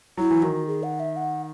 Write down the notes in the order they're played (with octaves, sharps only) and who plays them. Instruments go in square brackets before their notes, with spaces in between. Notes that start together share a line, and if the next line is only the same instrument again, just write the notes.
[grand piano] F#3 [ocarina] E4
[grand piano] E3
[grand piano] D#3 [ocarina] F#4
[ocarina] G#4
F#5
E5
F#5